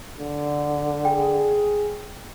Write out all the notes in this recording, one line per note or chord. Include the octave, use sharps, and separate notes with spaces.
D3
G#4 G5